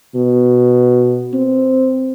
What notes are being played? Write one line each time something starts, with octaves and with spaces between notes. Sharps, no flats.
B2
C4